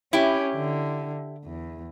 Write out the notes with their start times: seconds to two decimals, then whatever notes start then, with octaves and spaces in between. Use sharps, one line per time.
0.13 C#4 E4 G4
0.55 D3
1.45 E2